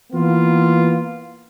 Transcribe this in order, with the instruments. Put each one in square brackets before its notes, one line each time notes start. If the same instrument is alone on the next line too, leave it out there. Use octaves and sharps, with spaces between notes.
[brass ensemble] E3 A#3 B3 F4